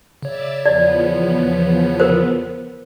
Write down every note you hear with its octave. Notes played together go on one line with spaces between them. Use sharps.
C#3 C#5 D5 E5 A6
E2 F3 B3 D5
A#4 C5